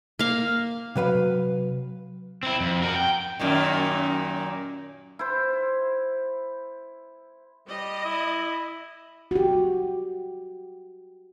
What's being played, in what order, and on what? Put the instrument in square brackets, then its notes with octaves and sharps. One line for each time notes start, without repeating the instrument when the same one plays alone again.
[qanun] A#3 F5
[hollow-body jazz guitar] C3 F#3 B4 F5
[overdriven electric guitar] C4 E4
F2
F#4 A#4
G5
[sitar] F#2 A#2 D#3
[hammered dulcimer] E4 C5
[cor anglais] G3 [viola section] D#5
[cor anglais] E4
[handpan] F#4 G4